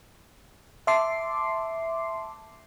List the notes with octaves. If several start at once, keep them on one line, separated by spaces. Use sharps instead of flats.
E5 A5 C6 D6 C7